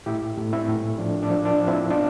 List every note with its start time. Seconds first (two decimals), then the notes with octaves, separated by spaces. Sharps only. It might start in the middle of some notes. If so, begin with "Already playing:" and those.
0.06 A2 E4 G4
0.38 A2
0.53 C4 E4
0.68 A2
0.98 F3 D4
1.22 D4
1.30 F3
1.45 D4
1.60 F3
1.68 C4 E4
1.91 B2 D4 F4